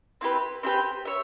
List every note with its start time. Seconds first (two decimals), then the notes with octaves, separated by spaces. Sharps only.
0.21 C4 E4 G4 B4
0.63 C4 E4 G4 B4
1.05 C#5 E5